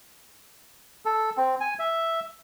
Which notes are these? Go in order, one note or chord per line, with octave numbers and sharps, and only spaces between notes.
A4
C4
G#5
E5